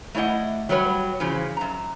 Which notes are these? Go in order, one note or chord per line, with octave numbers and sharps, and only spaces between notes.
A3 E4 D5 D#5 F#5
F#3 G3 F#4 B4 C#5
C#3 E3 F3
F#2 A#5